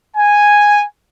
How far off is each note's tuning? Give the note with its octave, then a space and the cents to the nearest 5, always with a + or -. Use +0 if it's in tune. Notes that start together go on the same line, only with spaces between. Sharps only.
G#5 -5